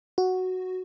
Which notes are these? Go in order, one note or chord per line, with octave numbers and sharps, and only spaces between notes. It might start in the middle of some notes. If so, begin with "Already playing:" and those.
F#4